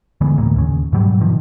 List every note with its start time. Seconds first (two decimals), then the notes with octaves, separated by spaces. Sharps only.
0.21 D3 E3 G#3 B3
0.38 G1 D2 A2 A#3
0.56 D#2 C#3
0.93 G#2 B2 F#3 G3
1.20 B2 D#3 F3